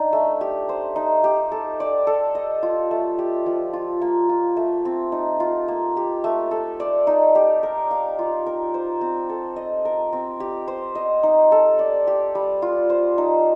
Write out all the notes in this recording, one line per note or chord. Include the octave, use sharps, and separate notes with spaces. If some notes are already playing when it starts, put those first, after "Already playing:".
Already playing: D4 D#4
A3
G4
C5
D#4
G4
A4
D5
A4
D#5
F4
A3
G4
F3
F4
A#3
F4
A3
C4
D#4
F4
A#3
G4
A3
A4
D5
D#4
G4
A#4
F5
F4
A#4
C5
C4
A4
D#5
A#4
C4
G4
C5
D#5
D#4
A4
D5
G4
G3
F4
C5
D#4